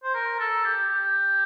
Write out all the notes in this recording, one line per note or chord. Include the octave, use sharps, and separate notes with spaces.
C5
A#4
A4
G4
G4